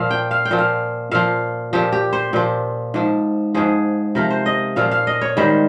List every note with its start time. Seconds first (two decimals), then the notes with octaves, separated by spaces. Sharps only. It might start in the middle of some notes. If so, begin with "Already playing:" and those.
Already playing: A#2 F3 F5
0.10 G5
0.31 F5
0.45 G5
0.51 A#2 F3
0.58 F5
1.11 A#2 F3 F5
1.73 A#2 F3 G4
1.92 G4
2.13 C5
2.33 A#2 F3
2.94 G#2 F3
3.55 G#2 F3 G#4
4.15 C3 F3 A#4
4.30 C5
4.46 D#5
4.76 A#2 F3 F5
4.91 F5
5.07 D#5
5.21 C#5
5.37 G#2 D#3 G3 C5